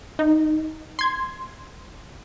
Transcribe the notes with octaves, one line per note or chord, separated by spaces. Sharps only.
D#4
C6 G#6